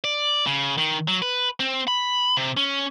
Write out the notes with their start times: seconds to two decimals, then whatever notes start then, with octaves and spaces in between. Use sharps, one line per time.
0.04 D5
0.47 C#3
0.78 D#3
1.08 F#3
1.22 B4
1.60 C4
1.88 B5
2.37 C3
2.57 C#4